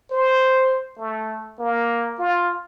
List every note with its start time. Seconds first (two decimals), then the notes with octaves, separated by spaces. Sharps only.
0.11 C5
0.99 A3
1.59 A#3
2.19 F4